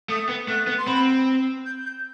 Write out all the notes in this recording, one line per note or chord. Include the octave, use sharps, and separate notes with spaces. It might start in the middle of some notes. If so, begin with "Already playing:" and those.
A3 D#6
B3
A3 F#6
B3
C6
C4 B5
G6
G6